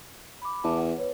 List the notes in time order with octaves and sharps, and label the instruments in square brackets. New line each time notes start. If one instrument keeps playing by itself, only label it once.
[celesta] B5 D6
[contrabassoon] E2 [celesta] A5 D6
[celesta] F#5
B4 C#5